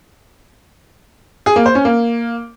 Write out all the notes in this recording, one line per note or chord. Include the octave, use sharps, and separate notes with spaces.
G#4
A#3
C5
C#4
A#3